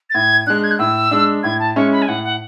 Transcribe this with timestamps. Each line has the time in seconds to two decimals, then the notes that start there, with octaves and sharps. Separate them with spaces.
0.10 A6
0.15 A2 G#6
0.47 G#3 D4 F#6
0.64 G#6
0.71 F#6
0.79 A2 E6
1.11 G#3 D4
1.43 A2 G#6
1.60 A5
1.76 G#3 C#4 E4 C#6
1.92 B5
2.02 G#5
2.08 A2 F#5
2.24 F#5